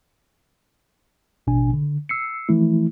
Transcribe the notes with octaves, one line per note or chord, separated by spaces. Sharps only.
A1 B2 D4 G#5
D3
E6 C7 C#7
E3 F3 A3 E4